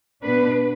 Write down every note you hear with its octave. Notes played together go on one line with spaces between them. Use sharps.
B2 B3 D4 B4